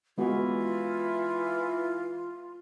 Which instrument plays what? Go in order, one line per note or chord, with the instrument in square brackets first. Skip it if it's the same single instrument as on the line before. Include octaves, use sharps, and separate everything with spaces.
[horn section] E3 [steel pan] G#3 B3 F#4 [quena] F4